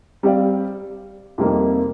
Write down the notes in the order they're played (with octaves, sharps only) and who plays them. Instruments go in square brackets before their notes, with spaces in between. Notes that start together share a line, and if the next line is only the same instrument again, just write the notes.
[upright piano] G3 C4 G4 D5 F5
F2 C3 G3 A#3 D#4